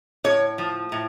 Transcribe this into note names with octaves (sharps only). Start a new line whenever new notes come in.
A2 C#5
F3
A2